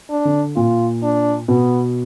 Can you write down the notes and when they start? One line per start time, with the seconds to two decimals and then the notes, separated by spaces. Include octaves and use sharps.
0.10 D4
0.25 D3
0.56 A#2 F4
1.03 D4
1.48 B2 B3